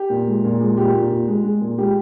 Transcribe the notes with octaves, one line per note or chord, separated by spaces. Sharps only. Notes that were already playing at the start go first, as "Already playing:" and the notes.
Already playing: G4
A#2
G#3
A#2
G#3
A#2 G4
A#2
A#2
G#3
G#3
A#2
G#3 G4